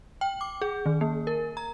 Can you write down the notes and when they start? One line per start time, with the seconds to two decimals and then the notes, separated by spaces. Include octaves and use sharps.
0.21 G5
0.41 D6
0.62 G#4
0.86 D#3
1.01 A#3
1.27 A#4
1.57 A#5